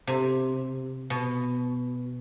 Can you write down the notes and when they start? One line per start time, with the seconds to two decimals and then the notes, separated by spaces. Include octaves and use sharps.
0.07 C3
1.10 B2